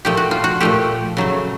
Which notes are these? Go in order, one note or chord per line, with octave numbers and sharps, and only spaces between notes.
A#2 F3 A3 G4
F#4
F4
F#4
A#2 F3 A3 G4
C#3 F#3 A3